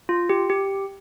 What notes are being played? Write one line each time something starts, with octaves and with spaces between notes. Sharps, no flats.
F4
G4
G4